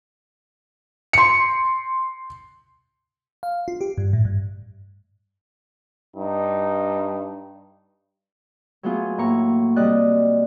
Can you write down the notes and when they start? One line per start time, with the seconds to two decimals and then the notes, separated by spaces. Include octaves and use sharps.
1.13 C6 C#7
3.43 F5
3.68 F4
3.81 G4
3.98 G2
4.13 A2
4.25 G2
6.16 G2 D#4
8.83 F#3 A3 B3 F4 G#4
9.18 A2 A#3 A#5 C#6
9.76 C3 G3 D5 D#5 F#6